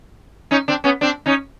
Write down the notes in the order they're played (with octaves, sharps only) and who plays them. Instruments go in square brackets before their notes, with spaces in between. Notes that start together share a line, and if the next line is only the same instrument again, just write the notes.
[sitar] C#4 D#4
C4 D4
B3 C#4
C4 D4
C#4 D#4